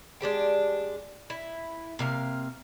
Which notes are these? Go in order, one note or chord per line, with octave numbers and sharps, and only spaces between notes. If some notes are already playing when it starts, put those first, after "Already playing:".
G#3 D4 G4 G5
E4
C3 A#3 F5